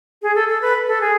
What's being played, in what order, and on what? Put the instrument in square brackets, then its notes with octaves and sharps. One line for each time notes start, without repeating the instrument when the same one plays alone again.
[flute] G#4
A4
A4
B4
A4
G#4